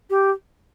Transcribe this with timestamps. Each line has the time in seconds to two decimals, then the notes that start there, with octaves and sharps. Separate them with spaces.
0.10 G4